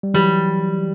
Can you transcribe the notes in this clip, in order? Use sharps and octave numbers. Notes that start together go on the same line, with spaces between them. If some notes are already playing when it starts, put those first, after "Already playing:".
G3
E3 F#3 G3